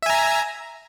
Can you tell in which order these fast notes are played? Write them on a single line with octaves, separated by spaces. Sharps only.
E5 G#5 A#5